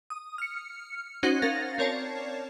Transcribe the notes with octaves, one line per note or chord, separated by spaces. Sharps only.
D#6
F6 C#7
C#4 D#4 F#4 C5 F#5 F#6
C#4 A#4 F5 A6 A#6
C4 A#4 C#5 D5 A5 C7